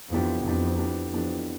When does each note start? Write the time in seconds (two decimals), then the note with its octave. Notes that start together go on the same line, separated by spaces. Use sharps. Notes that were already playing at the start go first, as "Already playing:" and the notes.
0.11 F2 E3 B3 D4 G4
0.45 F2 E3 B3 D4 G4
0.78 E3 B3 D4 G4
1.12 F2 E3 B3 D4 G4